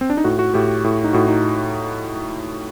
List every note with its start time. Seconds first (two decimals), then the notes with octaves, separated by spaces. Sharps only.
0.01 C4
0.10 D4
0.17 D#4
0.24 A2 F#4
0.39 F#4
0.54 A2 G4
0.84 A2
1.04 D#4
1.13 A2 F#4
1.28 D#4